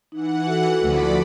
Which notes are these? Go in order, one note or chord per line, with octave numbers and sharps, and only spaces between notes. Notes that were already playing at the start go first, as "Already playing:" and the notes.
E3 D#4 F#5
F#4 A4
D2 F3 D5 B5